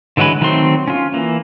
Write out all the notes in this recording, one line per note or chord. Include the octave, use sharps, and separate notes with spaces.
D3 E3 F#3 G#3 B4
D#3 F#3 A3 C4 C6
C#4 F4
E3 A#3